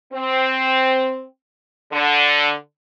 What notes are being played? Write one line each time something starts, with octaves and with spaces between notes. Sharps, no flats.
C4
D3